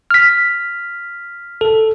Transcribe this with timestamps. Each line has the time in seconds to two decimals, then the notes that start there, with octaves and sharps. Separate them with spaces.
0.11 F6 B6
1.61 A4